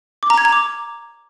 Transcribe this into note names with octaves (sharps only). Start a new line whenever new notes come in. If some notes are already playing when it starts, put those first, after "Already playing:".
D6
A#5
G#6
A#5
D6